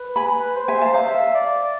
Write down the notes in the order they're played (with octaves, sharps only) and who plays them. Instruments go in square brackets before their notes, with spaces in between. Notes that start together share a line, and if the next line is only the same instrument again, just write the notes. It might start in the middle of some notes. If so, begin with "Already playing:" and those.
Already playing: [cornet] B4
[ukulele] G#5 B5
[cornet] C5
[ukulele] E5 G#5
F5 A5
[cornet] E5 [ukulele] F5 A5
[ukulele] F5 A5
[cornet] D5